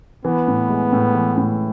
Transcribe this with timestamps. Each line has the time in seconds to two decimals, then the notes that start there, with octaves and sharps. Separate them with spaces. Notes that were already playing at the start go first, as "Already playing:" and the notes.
0.25 E3 B3
0.48 A2
0.70 G#3
0.92 A2
1.15 E3
1.37 A2